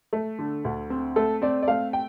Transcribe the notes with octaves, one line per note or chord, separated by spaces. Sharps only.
A3
D3
D2
C4
A3 A4
C4 D5
D5
A3 F5
G5